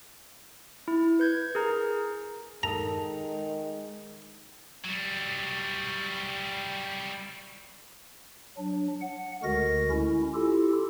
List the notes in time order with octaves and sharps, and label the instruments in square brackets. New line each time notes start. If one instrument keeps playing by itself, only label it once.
[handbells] E4
B4 G6 G#6
G#4 A#4 A#5
[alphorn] D#3 [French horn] G#3 [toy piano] A4 A#4 A5 [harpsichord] A#5
[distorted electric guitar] F#3 G3
[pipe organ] F#3 D4
F#5
D2 D3 G#3 F#4 A#4 A#6
C#4 E4
E4 F4 G4 A4